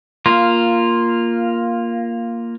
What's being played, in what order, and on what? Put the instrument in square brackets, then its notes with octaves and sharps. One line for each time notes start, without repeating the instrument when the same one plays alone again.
[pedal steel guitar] A#3 F4